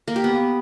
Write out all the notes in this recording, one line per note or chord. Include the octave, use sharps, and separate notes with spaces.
A#3
G4
B3